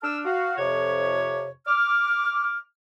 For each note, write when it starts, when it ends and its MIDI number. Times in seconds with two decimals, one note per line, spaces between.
0.01 0.17 62
0.01 0.17 81
0.01 0.17 88
0.01 0.17 89
0.24 0.57 66
0.24 0.57 77
0.57 1.50 41
0.57 1.50 48
0.57 1.50 73
1.66 2.57 86
1.66 2.57 89